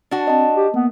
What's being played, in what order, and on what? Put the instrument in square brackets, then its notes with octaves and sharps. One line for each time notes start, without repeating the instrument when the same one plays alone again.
[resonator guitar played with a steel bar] D4 F#4
[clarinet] C4 [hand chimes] D#5 A5
[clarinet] G4
[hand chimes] A#3 [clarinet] B3